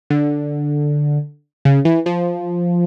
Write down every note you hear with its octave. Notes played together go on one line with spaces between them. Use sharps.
D3
C#3
E3
F3